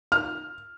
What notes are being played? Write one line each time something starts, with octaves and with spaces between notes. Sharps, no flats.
F6